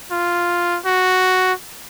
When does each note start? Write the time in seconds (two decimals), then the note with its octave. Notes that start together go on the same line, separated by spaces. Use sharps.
0.11 F4
0.85 F#4